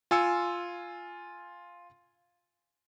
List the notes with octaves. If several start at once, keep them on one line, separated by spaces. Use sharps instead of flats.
F4 G#5 E6 C#7